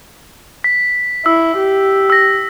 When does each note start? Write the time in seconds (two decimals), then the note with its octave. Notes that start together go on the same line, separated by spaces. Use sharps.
0.64 B6
1.26 E4 E6
1.58 G4
2.10 E6 A#6